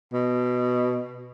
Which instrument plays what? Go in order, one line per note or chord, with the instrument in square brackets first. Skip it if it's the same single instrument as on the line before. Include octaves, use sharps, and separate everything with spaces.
[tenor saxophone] B2